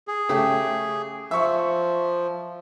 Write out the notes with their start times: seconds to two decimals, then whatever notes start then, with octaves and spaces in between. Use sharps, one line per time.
0.08 G#4
0.29 C#3 A3 G4
1.31 F3 E5 C#6